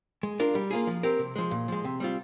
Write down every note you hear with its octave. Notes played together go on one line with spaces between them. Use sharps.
G#3
D4 F4 A#4
G3
A#3 F4 G#4
F3
C4 G4 A#4
C3
F3 G#3
A#2
F3 G#3
C3
G3 C4 F4